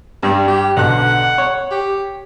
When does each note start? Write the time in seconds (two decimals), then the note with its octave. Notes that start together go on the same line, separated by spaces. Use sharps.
0.23 G2 G3
0.48 G4
0.77 B1 D3 F#5 F#6
1.38 C#5
1.71 G4